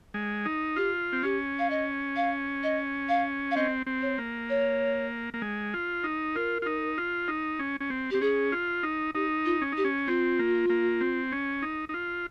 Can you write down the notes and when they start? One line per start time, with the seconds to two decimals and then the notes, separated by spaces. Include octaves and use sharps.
0.14 G#3
0.45 D#4
0.76 F4 G4
1.12 C4
1.23 C#4 G4
1.59 F5
1.70 D#5
2.16 F5
2.63 D#5
3.09 F5
3.51 F5
3.56 C4 D#5
3.86 C4
4.02 C#5
4.18 A#3
4.50 C#5
5.34 A#3
5.42 G#3
5.74 F4
6.04 D#4
6.35 F4 A#4
6.62 F4
6.66 D#4
6.98 F4
7.28 D#4
7.59 C#4
7.80 C#4
7.90 C4
8.11 C4 G4
8.21 C#4 G#4
8.52 F4
8.83 D#4
9.15 D#4 G4
9.45 F4
9.62 C#4
9.72 D#4 G4
9.85 C#4
10.07 C4 F4
10.39 A#3
10.70 A#3
11.01 C4
11.32 C#4
11.62 D#4
11.89 D#4
11.94 F4